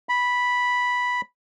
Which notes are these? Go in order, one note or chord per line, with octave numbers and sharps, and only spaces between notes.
B5